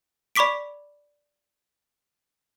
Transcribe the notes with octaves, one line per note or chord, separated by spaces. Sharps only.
D5 B5 C#6 D6 B6 D7